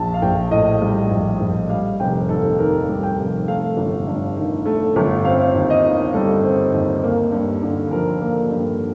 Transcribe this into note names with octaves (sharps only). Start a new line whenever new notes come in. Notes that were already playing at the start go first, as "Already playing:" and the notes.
Already playing: A#1 A5
F5
A#1 G5
A2 D#5
G3
A#1
A#1
G3 F5
F1 G5
D#2 A4
D#3 A#4
G3
G5
F1
A3 F5
G1
G2
D#3
A3
G1
C4 F5
D#2
D#5
D#3
G3 A4
C4
D#2
A#3
G2
D3
F3 A#4
A#3
G2